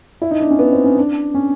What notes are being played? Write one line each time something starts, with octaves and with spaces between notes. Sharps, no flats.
E4
D#4
D4
C#4
B3
C4
C#4
D4
C#4